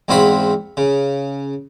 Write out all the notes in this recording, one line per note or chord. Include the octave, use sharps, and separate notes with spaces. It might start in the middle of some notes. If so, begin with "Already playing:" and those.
E2 G#2 C4 F#4 F5 B5
C#3